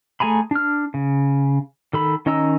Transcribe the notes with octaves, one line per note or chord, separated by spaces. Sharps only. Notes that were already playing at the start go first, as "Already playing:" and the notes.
A3 G#4 G#5 A#5 B5
D4 F6
C#3
D#3 A4 B5
D#3 C#4 D#5 A#5 E6